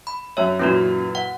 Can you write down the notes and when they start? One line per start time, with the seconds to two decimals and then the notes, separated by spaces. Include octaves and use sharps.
0.07 B5
0.37 F#2 C#5 E5
0.59 F#2 A#2 E3 C#4 F#4
1.15 F#5